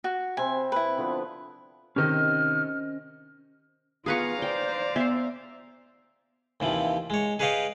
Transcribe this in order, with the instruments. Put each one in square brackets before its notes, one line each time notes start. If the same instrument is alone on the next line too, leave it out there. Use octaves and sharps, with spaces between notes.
[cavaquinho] F#4
[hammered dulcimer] C3 C4 B5 [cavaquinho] G#5
[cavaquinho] E4 B4
[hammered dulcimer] D3 F3 B3
[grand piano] C3 D#3 [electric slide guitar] C#4 C5 D#5 [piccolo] F6
[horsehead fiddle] B3 F4 [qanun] G#4 B4 C#6 [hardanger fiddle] F5 A#5
[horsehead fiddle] C5 D5 [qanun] G5
[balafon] B3 [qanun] E5 C6
[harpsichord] D#2 C3 E3 F3
G#3 C#5
G#4 B4 C#5 D#5 F5 G5